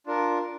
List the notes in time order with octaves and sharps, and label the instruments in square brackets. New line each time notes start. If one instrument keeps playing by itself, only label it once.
[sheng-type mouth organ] D4 F4 A#4